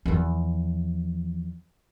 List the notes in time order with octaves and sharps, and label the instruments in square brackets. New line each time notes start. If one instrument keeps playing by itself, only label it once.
[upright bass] E2 F3